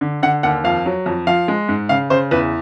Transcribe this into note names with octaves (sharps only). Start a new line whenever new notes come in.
D3
D3 F#5
D#2 F#5
F2 F5
F#3
F2
F3 F5
G#3
G#2
C#3 F5
C#3 C5
E2 B4